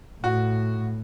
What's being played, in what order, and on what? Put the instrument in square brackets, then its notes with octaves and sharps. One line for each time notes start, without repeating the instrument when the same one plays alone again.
[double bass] A2 [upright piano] F#4